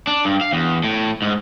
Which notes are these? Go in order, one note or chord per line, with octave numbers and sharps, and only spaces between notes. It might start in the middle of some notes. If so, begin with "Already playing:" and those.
D4
G2
F5
E2
A2
G#2